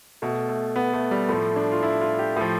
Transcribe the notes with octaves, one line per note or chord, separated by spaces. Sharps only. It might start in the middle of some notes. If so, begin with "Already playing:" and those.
B2 A3
A3
B3
A3
G3
A2 F3 A3
D4
F4
E4
F4
G4
A2 F3